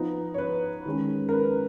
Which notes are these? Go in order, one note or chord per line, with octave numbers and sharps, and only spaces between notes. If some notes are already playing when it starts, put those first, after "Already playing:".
Already playing: F3 B3 D#4
C#5
B4
D#3 G#3 C#4
A#4
B4